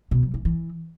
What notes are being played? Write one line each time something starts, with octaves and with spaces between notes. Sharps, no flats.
B2
F#3
E3
E3